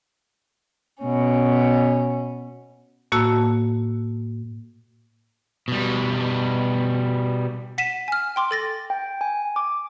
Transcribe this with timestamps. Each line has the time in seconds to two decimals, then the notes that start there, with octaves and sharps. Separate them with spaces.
1.03 B2 C#4
3.12 A2 A#3 F#4 A5 E6
5.68 B2 G3
7.78 F#5 B6 D#7 E7
8.08 G#5 F6
8.36 G5 C6 D6
8.51 A4 A6 A#6
8.90 G5
9.21 G#5
9.56 D6